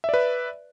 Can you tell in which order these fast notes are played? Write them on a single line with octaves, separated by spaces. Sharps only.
E5 D5 B4